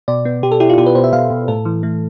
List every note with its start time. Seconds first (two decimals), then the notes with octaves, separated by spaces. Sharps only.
0.08 B2 D5
0.25 B3
0.43 B2 G4
0.52 A4
0.60 E4 G4
0.70 F4
0.78 B2 G4
0.86 B4
0.95 B2 C5
1.04 E5
1.13 B2 F5
1.30 B2
1.48 A2 A4
1.65 E3
1.83 A3